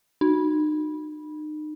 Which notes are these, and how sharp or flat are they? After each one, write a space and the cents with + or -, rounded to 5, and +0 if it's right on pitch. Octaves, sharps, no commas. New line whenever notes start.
D#4 -35